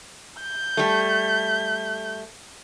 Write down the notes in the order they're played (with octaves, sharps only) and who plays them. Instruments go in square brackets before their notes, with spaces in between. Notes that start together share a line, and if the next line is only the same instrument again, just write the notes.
[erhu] G6
[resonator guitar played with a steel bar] G3 A3